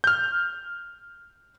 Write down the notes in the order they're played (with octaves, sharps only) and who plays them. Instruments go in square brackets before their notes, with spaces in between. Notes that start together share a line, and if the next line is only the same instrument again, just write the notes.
[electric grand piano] F6 G6